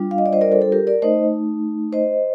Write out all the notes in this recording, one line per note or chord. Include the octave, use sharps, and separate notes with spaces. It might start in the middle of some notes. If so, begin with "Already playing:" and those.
Already playing: G3 D4 F4
F5
D#5
D5
C5 D#5
A#4 D5
A4 C5
A4
G4 A#4
A#4 D5
A3 D#4 C5 D#5
C5 D#5